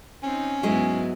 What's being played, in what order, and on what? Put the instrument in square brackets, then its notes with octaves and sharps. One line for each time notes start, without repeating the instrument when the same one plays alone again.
[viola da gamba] C4 D#4 [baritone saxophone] C#4
[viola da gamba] G#2 B3 E4 [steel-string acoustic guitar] F#3 G#3 G#4